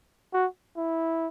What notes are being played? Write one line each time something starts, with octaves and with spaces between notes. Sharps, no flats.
F#4
E4